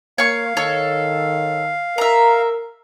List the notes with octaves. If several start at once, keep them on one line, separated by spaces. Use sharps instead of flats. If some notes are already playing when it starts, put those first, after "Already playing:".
A#3 C#5 F5 C#6
D#3 A4 C#5
A#4 E5 A#5